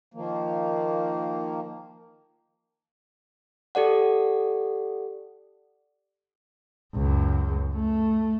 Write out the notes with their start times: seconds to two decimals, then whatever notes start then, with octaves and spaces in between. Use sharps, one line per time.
0.14 D#3 F3 A#3
3.75 G4 A4 D5 F#5
6.94 C#2 F#2
7.76 A3